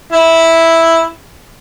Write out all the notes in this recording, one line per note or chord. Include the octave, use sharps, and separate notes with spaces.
E4